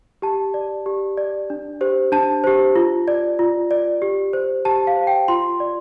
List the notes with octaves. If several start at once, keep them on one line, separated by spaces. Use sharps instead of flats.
G4 A5
D5
G4
D5
D4
G4 C5
D4 A5
G4 C5
F4
D5
F4
D5
G4
C5
G4 A5
F5
C5
G5
F4 C6
D5